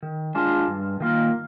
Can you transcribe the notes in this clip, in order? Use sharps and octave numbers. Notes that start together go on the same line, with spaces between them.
D#3
G#3 D4 F4
G2
D#3 A#3 F4